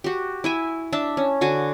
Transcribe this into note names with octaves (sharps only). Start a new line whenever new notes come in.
F#4 G4
E4 E5 G#5
D4 E5 A5
C#4
D3 F#4 G#5